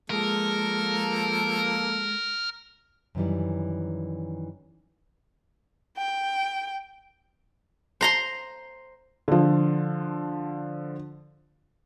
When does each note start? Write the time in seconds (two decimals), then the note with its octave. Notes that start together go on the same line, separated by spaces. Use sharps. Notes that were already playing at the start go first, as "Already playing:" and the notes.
0.10 F3 G#3 A#3 A4 A#4
3.15 F#2 D#3 E3 G3
5.98 G5
8.01 C5 A#5 C6
9.28 D3 F3